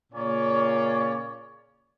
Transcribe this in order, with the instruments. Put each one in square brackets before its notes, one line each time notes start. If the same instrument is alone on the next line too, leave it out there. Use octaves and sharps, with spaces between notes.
[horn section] A#2 C#3 A#3 C#4 C#5 D5